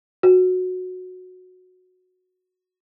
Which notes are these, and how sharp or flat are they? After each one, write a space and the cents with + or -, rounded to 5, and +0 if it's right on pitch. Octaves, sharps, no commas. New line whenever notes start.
F#4 -10